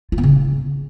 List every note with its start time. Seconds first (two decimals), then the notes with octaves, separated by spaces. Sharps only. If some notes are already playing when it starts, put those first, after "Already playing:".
0.12 F4
0.18 B3
0.24 C#3